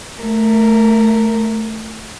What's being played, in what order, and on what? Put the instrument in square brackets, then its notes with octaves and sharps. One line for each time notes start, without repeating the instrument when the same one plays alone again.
[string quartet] A3 A#4